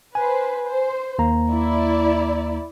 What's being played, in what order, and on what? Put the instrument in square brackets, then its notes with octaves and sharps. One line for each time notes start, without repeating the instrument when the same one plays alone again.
[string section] B4 C5 [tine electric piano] G#5
[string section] C5
[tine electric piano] D#2 A#3 A#5
[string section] E4 D5